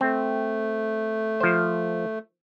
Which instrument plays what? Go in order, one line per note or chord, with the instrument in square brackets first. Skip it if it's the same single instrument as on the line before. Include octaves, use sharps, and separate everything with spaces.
[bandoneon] A3 [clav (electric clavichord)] C4
[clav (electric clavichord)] F3 C5